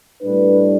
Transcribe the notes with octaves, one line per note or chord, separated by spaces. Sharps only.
A2 G3 D4 B4